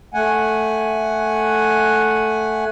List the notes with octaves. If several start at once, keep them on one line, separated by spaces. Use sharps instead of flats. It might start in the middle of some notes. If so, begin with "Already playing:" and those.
A3 F#5 G#5